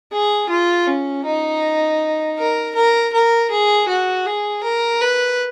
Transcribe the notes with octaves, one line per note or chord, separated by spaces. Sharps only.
G#4
F4
C#4
D#4
A#4
A#4
A#4
G#4
F#4
G#4
A#4
B4